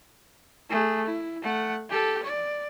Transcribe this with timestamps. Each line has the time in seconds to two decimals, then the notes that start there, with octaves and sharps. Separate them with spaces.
0.70 A3 G#4
1.06 E4
1.42 A3 F#5
1.90 G4 A4
2.23 D5